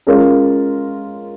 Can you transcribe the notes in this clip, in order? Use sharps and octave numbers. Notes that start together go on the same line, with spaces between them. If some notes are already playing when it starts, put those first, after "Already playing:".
G#3 C#4 F4 A#4 C#5